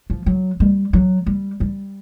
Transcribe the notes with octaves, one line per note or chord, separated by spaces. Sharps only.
F3
F#3
G3
F#3
G3
G3